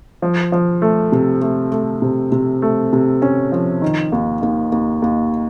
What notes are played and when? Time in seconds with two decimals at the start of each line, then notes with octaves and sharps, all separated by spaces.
0.22 F3
0.52 F3
0.82 A3
1.12 C3
1.42 A3
1.72 A3
2.02 C3
2.32 C3
2.62 A3
2.93 C3
3.22 C#4
3.52 F3
3.82 D#3
4.12 D#2
4.42 D#2
4.72 D#2
5.02 D#2